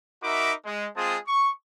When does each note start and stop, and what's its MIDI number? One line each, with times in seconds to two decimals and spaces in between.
0.23 0.52 63
0.23 0.52 66
0.23 0.52 70
0.23 0.52 76
0.23 0.52 83
0.23 0.52 86
0.65 0.86 56
0.96 1.17 56
0.96 1.17 60
0.96 1.17 65
0.96 1.17 68
0.96 1.17 81
0.96 1.17 87
1.27 1.49 85